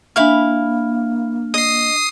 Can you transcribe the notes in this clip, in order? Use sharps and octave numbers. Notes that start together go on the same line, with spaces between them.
A#3 D4 E4 F5 B5 F6
D#5 D#6 C7